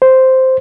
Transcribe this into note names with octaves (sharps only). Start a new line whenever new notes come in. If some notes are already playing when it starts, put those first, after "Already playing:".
C5